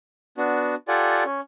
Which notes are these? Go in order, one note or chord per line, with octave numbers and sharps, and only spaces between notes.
B3 D4 F#4
F4 G4 A4 D5 F#5 G#5
C#4